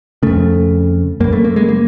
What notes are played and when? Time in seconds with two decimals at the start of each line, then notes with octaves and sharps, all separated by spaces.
0.23 F2 C#3 A3
1.20 F#2 A#3
1.24 C#3
1.33 A3
1.44 A#3
1.56 G#3
1.69 A#3